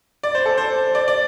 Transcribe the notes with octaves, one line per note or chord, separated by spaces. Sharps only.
D5
C5
A4
C5
D5
D5